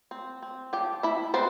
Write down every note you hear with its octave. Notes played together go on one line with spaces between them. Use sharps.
C4
C4
F3 G4 G5
F3 E4 E5
B3 C4 C5